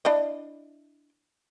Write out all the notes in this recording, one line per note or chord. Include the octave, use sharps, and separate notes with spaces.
D4 E4 D#5